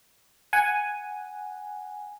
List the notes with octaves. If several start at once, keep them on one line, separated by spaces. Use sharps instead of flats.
F#5 G#5